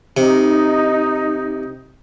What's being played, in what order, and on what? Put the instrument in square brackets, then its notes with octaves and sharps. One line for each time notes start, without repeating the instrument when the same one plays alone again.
[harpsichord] C3 [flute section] D#4